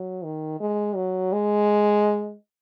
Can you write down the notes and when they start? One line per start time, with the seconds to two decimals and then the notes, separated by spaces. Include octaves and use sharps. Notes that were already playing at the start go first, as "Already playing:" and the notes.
Already playing: F#3
0.24 D#3
0.61 G#3
0.96 F#3
1.32 G#3